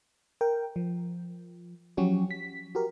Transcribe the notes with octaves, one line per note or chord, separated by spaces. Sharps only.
A#4 G5
F3
F3 F#3 C#4 F#4 G4
B6
F#4 G4 A#4